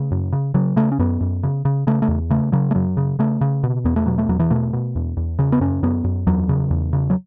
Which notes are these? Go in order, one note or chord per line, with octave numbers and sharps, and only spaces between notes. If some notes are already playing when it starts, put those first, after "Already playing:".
Already playing: C#3 A3
F#2
C#3
C#3 F#3
C#3 A3
C#4
F#2 B3
F#2
C#3
C#3
C#3 A3
A3
E2
C#3 A3
C#3 F#3
A3
F#2 F#3
C#3
C#3 A3
C#3
B2
E2 B3
A3
B2 F#3
A3
E2 F#3
E3
B2 A3
B2
E2
E2
C#3 C#4
B3
F#2 C#4
F#2 B3
F#2
E2 F#3
C#3
E2
C#3
F#3